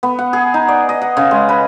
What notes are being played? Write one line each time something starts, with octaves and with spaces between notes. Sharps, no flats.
B3
F#5
G#4
D#4
D5
D#5
F#5
C#3
G#3
B4